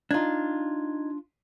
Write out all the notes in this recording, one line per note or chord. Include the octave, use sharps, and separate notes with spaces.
D4 D#4 F4 G#6